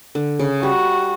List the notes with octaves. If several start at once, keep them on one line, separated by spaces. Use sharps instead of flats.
D3
C#3
G3 F#4